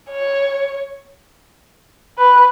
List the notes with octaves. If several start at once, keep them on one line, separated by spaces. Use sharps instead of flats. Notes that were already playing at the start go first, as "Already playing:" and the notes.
C#5
B4